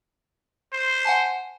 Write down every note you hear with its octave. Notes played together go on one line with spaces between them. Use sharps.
C5
F#5 G#5 A5